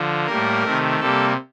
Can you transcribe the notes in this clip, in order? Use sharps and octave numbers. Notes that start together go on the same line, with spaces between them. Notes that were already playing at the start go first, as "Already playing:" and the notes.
Already playing: D3 F3
A2 G3 A#3 A#4
C3 D#3 A3
C3 G3 A#3 A4